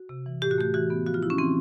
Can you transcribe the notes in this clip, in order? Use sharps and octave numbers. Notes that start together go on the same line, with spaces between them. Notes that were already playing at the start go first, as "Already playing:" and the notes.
Already playing: F#4
C3
E3
A2 G4
F#4
A3 G4
E3 F#4
B3
F3 F#4
F4
F3 E4
C#4
E3 C4